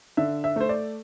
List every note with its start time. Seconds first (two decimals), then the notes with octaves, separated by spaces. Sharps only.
0.17 D3 E5
0.44 E5
0.56 A3 C5
0.69 D5